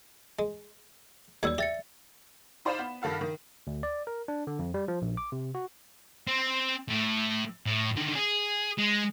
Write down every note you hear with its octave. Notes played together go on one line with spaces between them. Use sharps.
G#3
D#2 F#3 G3 D5 E6 G#6
G4 E5 A6 C#7
D#4 C5 D5 F5 B5 E7
B3
G2 D#3 A4 F5 F#5
D#3
D2
D5
A#4
D4
D3
F2
G3
F3
A#1
D6
C3
F#4
C4
A2
A2
D3 D#3
G#4
G#3